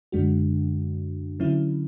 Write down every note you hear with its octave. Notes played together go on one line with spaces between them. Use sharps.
F#2 D3 G#3 D4 F#4
D3 F#3 C#4 E4